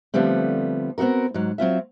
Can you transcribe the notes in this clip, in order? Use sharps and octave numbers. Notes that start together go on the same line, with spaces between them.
D3 F3 G3 A3 B3 C4
B3 C4 D#4 F#4 A#4
G#2 F#3
F#3 C4 F4 E5